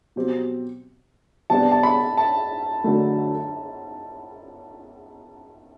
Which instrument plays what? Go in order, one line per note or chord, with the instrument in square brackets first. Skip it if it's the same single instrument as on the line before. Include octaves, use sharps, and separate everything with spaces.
[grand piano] B2 F#3 C4 G4 C5
[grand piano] C3 G3 B3 D4 G4 [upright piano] A5
[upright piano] A5
B5
A5
[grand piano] D3 F#3 A3